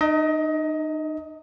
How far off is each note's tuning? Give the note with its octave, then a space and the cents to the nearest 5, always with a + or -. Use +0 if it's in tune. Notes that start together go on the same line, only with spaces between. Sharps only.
D#4 -30 D#5 +25